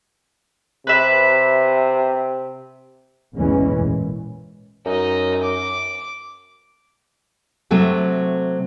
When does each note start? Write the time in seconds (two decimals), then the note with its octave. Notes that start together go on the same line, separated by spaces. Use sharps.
0.87 C3 B4 E5
3.35 A1 E2 E3 G#3 C#4
3.70 A#2
4.86 F#2 D#4 D#5
5.42 D6
7.71 C3 F#3 A3 C4